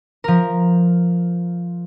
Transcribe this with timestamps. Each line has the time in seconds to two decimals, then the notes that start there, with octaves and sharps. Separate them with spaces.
0.24 F3 A#4